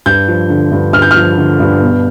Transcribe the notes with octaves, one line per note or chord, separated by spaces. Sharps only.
G2 G6
F3
D3
G2
G2 F6
G6
F6
F3
D3
G2
B2